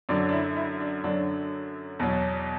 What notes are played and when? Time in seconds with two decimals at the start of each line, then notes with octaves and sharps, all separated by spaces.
0.09 F#2 D3 F#3 D5
0.29 D4
0.33 E4
0.57 E4
0.81 D4
1.04 F#2 D3 F#3 D4
1.99 E2 B2 F#3